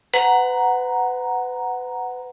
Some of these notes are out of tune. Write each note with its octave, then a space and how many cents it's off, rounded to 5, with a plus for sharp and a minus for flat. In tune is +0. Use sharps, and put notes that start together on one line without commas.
B4 +30 F#5 +0 A#5 +0